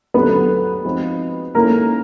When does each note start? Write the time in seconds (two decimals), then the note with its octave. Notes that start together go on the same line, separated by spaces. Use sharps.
0.14 D#2 D3 F#3 A3 B3 B4
0.84 F3 G#3 C4 D#4 F#4
1.55 D#3 G#3 A#3 C#4 E4 A4 A#4